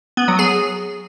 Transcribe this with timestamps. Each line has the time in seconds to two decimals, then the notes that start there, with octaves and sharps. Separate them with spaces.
0.17 B3
0.28 F#3
0.39 G#4